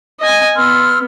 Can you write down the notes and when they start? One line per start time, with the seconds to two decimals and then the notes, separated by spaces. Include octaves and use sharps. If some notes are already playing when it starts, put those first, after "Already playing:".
0.20 D#5 G#5
0.56 B3 C6 E6 F6